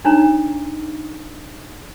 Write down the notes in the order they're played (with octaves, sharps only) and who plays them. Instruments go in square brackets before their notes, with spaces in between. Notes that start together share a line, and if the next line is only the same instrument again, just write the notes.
[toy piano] D4 D#4 C#5 A#5